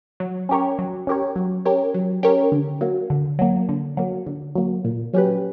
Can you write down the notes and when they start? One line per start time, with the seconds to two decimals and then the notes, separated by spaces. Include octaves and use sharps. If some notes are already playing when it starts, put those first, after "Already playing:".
0.20 F#3
0.49 C#4 G4 A#4 C#5
0.79 F#3
1.07 C#4 G4 A#4 C#5
1.36 F#3
1.65 C#4 G4 A#4 C#5
1.94 F#3
2.23 C#4 G4 A#4 C#5
2.52 D3
2.81 F#3 A#3
3.10 D3
3.39 F#3 A#3
3.69 D3
3.97 F#3 A#3
4.27 D3
4.55 F#3 A#3
4.85 A#2
5.14 F#3 C#4 G4 B4